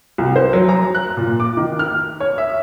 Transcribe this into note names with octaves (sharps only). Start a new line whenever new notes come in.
C2
C5
F#3
A#5
F#6
A#2
D6
D#3
F6
C#5
E5